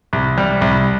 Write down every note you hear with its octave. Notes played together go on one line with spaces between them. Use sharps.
C2
G3
C2